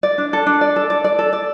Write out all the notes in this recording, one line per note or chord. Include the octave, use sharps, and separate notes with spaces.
D5
D4
A4
D4
D5
A4
D5
D5
A4
D5